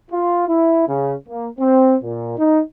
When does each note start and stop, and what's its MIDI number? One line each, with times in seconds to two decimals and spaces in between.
0.11 0.46 65
0.48 0.85 64
0.88 1.15 49
1.28 1.49 58
1.58 1.96 60
2.03 2.36 46
2.38 2.61 63